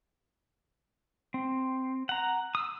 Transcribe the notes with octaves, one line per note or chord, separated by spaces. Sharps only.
C4
F#5 A#5
D#6 E6